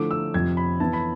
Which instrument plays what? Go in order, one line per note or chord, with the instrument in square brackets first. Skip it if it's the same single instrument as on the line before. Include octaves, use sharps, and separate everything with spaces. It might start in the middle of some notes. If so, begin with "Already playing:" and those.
Already playing: [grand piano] D3 F3 A3 E4 D6
E6
F2 C3 F3 G#6
B5
E3 B3 E4 A5
B5